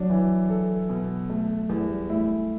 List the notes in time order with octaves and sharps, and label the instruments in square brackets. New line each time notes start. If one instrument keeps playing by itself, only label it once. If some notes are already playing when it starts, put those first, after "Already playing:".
Already playing: [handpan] F#3 [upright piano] D4
[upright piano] E3
A4
B2
A3
[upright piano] E2 [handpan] G3
[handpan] A3 [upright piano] E4